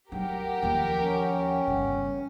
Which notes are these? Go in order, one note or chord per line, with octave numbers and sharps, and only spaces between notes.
F#3 D#4 G4 A#4 F#5 G5
D#2 F3
C#4
G1 C#3